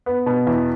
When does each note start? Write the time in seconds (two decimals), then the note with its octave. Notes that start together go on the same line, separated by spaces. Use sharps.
0.06 B3
0.26 B2
0.47 E2